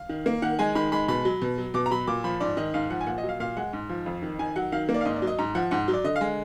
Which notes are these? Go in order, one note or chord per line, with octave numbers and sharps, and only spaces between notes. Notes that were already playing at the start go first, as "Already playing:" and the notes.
Already playing: F5
D#3
A#3
D#3 F#5
G#3 G#5
D#3 B5
G#3 B5
B2 B5
F#3
B2
F#3
B2 D6
A#5
F#3 B5
A#2 D6
F3 B5
G#2 D5
D#3 D#5
G#2 F5
F3 F#5
G#5
A#2 F#5
D#5
F#3
F5
A#2 F5
G#3 F#5
G#2
F3
F2
D#3
D#3 G#5
F#3 F#5
D#3 F5
A#3
D5
F5
G#2 D#5
D5
F#3
D#5
G#2 A#5
F3 F#5
G#2 F#5
F#3
D5
D3 D#5
F5
G#3